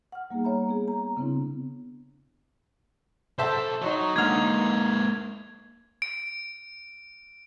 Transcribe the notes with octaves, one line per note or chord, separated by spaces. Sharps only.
F#5 F6
G3 A#3 B3 D#4 G#4
C#5 E5 A#5 B5
B3 G#4
A#5
C#3 B3 C4 D4 E4
B1 A4 C5 E5 A5
D#4 F#4 C#5
D3 G#3 A#3 F6 G#6 F7
D7